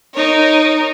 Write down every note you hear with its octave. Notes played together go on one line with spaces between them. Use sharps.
D#4 A#4 C#5